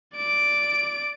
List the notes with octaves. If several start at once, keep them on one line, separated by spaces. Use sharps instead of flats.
D5 D7